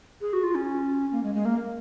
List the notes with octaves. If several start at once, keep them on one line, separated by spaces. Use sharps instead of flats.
G#4
F#4
F4
C#4
A#3
G#3
G#3
A#3